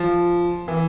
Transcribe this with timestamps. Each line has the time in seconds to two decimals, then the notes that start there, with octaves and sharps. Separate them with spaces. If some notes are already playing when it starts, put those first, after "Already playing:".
Already playing: F3
0.68 E3